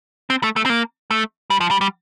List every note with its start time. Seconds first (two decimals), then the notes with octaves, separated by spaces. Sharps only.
0.30 C4
0.43 A3
0.56 A3
0.66 C4
0.70 A#3
1.11 A3
1.50 G3
1.60 F3
1.71 G3
1.81 G3